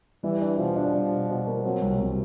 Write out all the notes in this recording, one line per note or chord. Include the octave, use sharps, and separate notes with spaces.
E3 G3
D4
B2 F3
D4
G3
B2
B2
A#3
F#3 C4
C2
C2